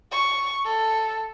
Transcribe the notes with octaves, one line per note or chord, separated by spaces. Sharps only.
C#6
A4